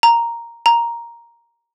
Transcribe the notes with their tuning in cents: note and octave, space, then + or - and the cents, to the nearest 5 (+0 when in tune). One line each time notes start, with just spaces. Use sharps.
A#5 +0
A#5 +5